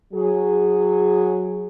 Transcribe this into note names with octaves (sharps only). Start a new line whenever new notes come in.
F#3 G#4